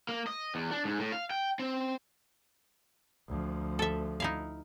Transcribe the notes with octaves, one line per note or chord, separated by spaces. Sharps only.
A#3
D#5
E2
D4
G#2
A2
F5
G5
C4
D2 F3
A4 E5
D#4 E4 F5